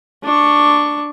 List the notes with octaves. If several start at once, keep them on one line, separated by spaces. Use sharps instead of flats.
D4 C#6